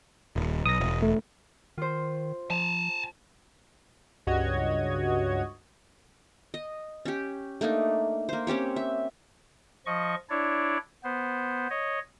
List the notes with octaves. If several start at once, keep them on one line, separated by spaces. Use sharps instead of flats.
D#1
B1 D#6 A#6
E1
A3
D#3 F4 C5
F3 G#5 A5
C#2 G2 F#4 C#5 D#5 G#6
D#5
C#4 G4
A3 A#3 D4 D#4
A#3 C5
C4 C#4 G4 C#5
E5
F3 D#5 C#6
D4 E4 C#5 D5
B3 C5
C#5 D#5